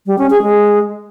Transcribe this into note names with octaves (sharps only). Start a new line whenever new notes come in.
G3
C#4
G#4
G#3